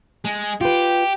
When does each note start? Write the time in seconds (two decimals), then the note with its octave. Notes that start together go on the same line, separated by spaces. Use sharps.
0.25 G#3
0.61 F4 G4 B4